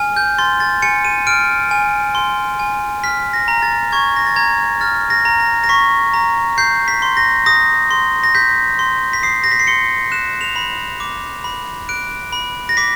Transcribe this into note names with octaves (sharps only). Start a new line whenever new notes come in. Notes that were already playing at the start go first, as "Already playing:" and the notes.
Already playing: G#5 F6
G6
C6 A6
A6
G#5 C#7
D#7
F6 D7
G#5
C6
G#5
F6 B6
A#6
A#5
A6
C#6 G#6
A#6
A6
A#5 G#6
F6 A6
A#6
A#5
A#6
A#6
C#6 B6
A#5
G6 C7
B6
C6
A#6
D#6 A#6
C6
A#6
G6 B6
C6
B6
D#6 C7
A#6
B6
C7
C6 C#7
F#6 E7
F7
B5
D6
B5
F#6 D7
B5
A#6
D6 B6